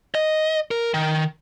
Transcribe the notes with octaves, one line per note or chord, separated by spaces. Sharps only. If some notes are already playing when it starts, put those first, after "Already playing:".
D#5
A#4
D#3